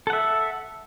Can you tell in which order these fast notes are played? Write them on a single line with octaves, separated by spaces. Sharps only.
A4 F#5 E5